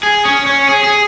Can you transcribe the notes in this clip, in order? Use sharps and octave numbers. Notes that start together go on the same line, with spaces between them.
G#4
C#4
C#4
G#4
G#4